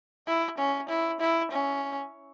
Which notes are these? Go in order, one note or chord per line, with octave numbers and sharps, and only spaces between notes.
E4
C#4
E4
E4
C#4